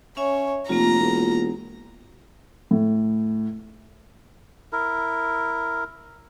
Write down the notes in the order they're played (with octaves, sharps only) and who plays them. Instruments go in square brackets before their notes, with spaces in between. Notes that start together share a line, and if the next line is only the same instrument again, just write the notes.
[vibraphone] C#4 E5 G#5 [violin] C#5
[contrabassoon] F1 [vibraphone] A#3 F4 [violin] A#5
[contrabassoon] E1
[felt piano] A2
[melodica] E4 A#4